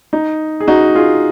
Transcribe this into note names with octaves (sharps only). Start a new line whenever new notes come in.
D#4
G#4
D#4 F#4
F4 G#4